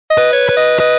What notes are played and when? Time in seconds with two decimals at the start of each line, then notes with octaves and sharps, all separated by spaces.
0.10 D#5
0.18 B4
0.33 C#5
0.49 B4
0.57 D#5
0.80 B4 D#5